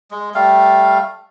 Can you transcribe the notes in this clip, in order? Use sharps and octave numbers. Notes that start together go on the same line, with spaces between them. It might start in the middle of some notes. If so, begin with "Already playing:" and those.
G#3
G3 A3 F5